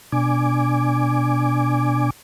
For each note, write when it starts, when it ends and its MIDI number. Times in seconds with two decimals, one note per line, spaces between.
0.12 2.10 47
0.12 2.10 62
0.12 2.10 80
0.12 2.10 86